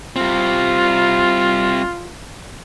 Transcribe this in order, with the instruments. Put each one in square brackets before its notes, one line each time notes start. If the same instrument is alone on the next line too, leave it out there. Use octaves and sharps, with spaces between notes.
[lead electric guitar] G3 C4 [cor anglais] F4